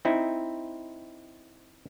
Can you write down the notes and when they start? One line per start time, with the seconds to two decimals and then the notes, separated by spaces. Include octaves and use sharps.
0.05 C4 D#4 E4